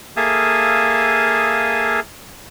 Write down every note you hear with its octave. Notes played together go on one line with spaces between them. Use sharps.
A#3 G#4 A4 E5 F5 D#6